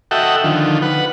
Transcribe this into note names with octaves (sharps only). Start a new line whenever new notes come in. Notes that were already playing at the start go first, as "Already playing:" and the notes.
F#4 A4 D#5 E5 F#5 G5
D3 D#3 F3
B4 F#5